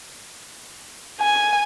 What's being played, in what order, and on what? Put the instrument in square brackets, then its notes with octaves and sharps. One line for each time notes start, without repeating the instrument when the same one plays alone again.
[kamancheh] G#5